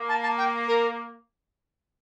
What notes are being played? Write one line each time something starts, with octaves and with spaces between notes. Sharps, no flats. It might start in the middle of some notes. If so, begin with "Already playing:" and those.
Already playing: A#3
A5
A5
G5
A#4